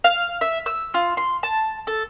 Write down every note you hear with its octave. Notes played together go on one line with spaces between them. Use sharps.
F5
E5
E6
F4
C6
A5
A4